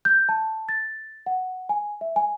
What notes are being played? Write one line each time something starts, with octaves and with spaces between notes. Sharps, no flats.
G6
A5
A6
F#5
G#5
E5
G#5